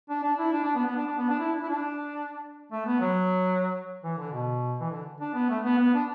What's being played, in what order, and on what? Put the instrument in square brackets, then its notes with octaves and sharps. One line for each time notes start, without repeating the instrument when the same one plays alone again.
[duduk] D4
D4
E4
D4
D4
B3
B3
D4
D4
B3
D4
E4
D4
E4
D4
A3
B3
F#3
E3
D3
B2
E3
D3
D4
B3
A3
B3
B3
D4